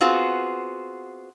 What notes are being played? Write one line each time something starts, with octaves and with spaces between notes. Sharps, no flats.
B3 C4 F4 F#4 G#4